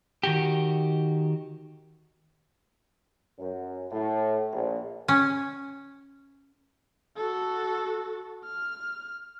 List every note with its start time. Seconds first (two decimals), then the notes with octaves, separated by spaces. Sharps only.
0.23 D#3 F#4 G4
3.39 F#2
3.91 A2
4.52 A#1
5.08 C#4
7.17 F#4 A4
8.45 F6